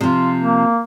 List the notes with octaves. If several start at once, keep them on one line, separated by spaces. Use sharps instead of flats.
C3 F3 F4
A#3